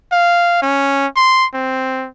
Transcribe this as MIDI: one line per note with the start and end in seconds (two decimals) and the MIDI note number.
0.12 0.58 77
0.62 1.06 61
1.16 1.46 84
1.54 2.08 60